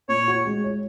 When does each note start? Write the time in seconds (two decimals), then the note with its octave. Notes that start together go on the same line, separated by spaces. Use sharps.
0.09 A#2 C#5
0.28 F#4
0.46 G#3
0.64 C#5